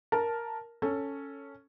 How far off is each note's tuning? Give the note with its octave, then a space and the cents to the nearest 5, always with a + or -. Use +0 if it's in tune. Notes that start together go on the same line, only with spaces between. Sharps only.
A#4 +0 A5 +0
C#4 +0 A4 +10